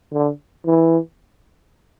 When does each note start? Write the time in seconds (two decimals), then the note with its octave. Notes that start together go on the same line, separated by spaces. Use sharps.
0.13 D3
0.66 E3